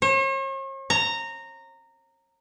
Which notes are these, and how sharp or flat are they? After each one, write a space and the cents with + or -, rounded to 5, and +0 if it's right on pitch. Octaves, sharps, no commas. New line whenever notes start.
C#5 -45
A#5 -15